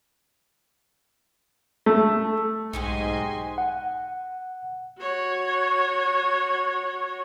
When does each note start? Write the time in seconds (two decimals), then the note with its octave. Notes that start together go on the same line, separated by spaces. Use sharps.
1.86 A3
2.73 B1 G#2 D#4 F#4 G4 D#5 G#5 C6
3.58 F#5
4.99 F#4 C#5